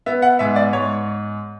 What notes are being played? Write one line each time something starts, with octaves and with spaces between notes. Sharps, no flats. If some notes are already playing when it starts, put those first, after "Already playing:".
B3 E5
F#5
G#2 E5
D5
G#2 C#5